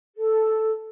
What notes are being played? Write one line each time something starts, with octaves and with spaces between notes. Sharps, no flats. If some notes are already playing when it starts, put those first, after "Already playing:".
A4